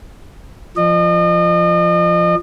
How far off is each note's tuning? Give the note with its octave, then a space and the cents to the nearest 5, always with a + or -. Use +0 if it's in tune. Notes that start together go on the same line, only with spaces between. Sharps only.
F3 -10 D#5 -35